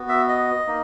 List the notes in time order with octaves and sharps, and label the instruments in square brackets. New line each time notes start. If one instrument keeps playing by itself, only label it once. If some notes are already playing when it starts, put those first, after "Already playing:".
Already playing: [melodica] B3 F#4
E5
D#5
A#3 D#4